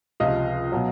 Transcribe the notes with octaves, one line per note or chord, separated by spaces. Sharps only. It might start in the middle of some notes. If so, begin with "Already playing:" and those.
C#2 C3 F3 D#5 F5
B2 F#3